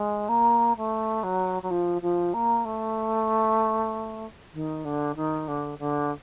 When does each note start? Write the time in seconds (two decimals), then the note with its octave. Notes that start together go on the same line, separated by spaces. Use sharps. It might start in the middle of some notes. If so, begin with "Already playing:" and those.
Already playing: G#3
0.28 A#3
0.76 A3
1.23 F#3
1.62 F#3
1.70 F3
2.01 F3
2.33 A#3
2.65 A3
4.53 D#3
4.84 D3
5.15 D#3
5.47 D3
5.78 D3